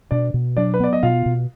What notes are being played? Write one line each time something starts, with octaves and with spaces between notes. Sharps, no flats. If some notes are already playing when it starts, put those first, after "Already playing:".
B2 D4 D5
B2
F#3 D4 D5
B4
B3 D5
D#5
B2 F4 F5
B2